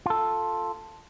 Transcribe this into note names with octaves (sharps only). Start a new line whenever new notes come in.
F4 A4